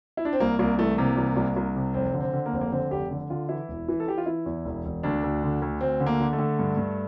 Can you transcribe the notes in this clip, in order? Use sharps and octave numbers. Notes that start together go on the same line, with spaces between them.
E4
D4
C4
C2 A#3
C2 A#3
E3 A3
C3 A#3
C2
C2
C2
C3
F1 C4
D3
C4
D3
A#3
F1 C4
A#3
D3 C4
F1 G4
D3
D3 F4
E3 E4
E1
E3
A4
E3 G4
F4
E3 E4
E2
E1
E1
D2 D4
D2
D3
D2
D2 C4
D3
A#3
D3
A3
D3
G2
G2